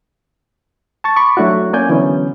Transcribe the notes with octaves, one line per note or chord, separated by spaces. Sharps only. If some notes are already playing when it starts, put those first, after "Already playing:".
A5 C#6 A6
B5 C#6 D6
F#3 A3 D4 E4 F#4
A#3 C#4 D5 G#5 G6
D3 E3 F#3 B3 C#4